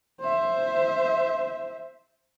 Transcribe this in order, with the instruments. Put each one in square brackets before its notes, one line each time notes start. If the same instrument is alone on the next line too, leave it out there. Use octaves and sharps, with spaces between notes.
[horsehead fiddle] C5 E5